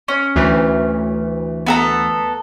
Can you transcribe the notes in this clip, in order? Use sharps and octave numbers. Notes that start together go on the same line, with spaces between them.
C#4
D2 E3 A3
B3 A4 A#5